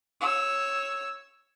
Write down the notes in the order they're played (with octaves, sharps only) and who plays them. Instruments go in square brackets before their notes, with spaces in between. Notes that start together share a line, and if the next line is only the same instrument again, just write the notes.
[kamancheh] C#5 E6